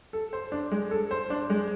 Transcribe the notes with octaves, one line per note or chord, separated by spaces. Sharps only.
A4
C5
D4
G#3
A4
C5
D4
G#3